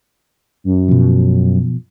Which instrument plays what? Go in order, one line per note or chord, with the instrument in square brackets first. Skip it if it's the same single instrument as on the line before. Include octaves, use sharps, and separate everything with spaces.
[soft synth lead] F#2
[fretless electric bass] B2 F3